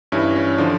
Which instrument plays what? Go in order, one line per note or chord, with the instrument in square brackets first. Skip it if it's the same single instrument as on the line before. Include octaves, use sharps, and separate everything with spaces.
[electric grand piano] G2 C#4 E4
E3
C#4
D3 F3 D4